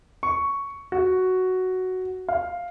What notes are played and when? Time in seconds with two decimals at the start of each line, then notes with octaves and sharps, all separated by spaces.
0.23 C#6
0.92 F#4
2.29 F5